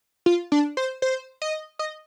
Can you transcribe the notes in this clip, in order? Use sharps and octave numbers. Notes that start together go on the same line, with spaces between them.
F4
D4
C5
C5
D#5
D#5